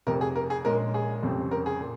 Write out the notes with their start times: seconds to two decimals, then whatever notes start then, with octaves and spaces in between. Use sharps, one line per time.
0.07 F1 F2 C3 A#4
0.21 G#4
0.36 A#4
0.50 G#4
0.65 A#1 A#2 G#3 C#4 A#4
0.94 G#4
1.23 F1 F2 C#3 G3 C4
1.51 A#4
1.66 G#4
1.81 A#2